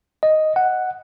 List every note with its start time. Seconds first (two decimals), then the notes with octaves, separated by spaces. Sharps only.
0.23 D#5
0.56 F#5